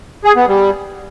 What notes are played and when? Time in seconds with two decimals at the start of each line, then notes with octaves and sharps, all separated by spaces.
0.24 G#4
0.36 B3
0.48 G3